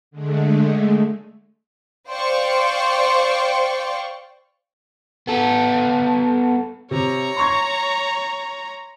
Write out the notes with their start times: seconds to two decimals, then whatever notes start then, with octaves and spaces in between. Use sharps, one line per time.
0.11 D3 G#3 A3
2.09 C5 D5 F5 G5 C6 C#6
5.27 B3 A4
6.91 C3 C#5 A#5
7.37 C6 C#6 G#6